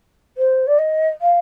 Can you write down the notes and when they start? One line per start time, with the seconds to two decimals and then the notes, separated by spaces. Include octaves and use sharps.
0.37 C5
0.67 D5
0.78 D#5
1.21 F5